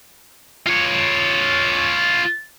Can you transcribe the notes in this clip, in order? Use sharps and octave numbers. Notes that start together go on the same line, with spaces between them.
F4 C#5